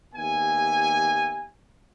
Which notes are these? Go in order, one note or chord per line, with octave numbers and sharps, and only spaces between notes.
D#2 B3 G4 E5 G#5